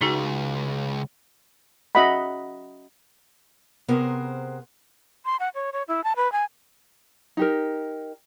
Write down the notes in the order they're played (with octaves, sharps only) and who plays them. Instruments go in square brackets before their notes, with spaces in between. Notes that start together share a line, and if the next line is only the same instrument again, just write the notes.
[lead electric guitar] C#2 [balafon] D#4 F#4 G#4
[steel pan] C#4 F#4 D#5 E5 F#5 B5
[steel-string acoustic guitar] C3 B3 G#4 A#4 C5
[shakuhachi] C6
F#5
C#5
C#5
E4
A5
B4
G#5
[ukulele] D#4 G4 A#4